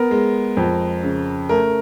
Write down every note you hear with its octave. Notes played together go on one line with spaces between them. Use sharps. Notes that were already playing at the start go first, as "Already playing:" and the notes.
Already playing: B3 A#4
G#3
F2
C#3
A3 A#4